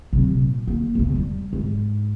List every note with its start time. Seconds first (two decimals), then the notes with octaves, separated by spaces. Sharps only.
0.13 C3 F#3
0.31 A#2
0.67 A#3
0.95 E2 C#3
1.15 G3
1.53 G#2